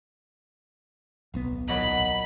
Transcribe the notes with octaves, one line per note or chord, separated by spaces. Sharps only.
D1 B1 B3
A#2 F#3 D#4 B5